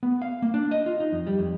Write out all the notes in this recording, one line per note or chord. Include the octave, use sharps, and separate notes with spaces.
B3
F5
A#3
D4
D#5
F4
D#4
F2
G3
F2